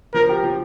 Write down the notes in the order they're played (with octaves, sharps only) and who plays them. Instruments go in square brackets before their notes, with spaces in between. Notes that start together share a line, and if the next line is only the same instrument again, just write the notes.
[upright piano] F3 [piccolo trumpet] A#4
[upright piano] G4
F3